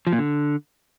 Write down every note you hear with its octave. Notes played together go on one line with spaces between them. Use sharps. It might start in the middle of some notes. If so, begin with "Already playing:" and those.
F3
A#2
D3